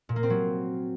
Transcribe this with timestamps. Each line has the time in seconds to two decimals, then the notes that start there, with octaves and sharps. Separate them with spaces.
0.09 A#2
0.16 A#3
0.23 C4
0.30 F#3